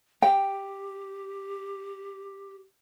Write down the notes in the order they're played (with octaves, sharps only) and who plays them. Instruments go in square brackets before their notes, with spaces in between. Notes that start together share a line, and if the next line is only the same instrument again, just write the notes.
[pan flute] G4 [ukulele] G5